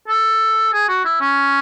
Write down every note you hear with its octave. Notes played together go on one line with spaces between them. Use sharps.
A4
G#4
F#4
E4
C#4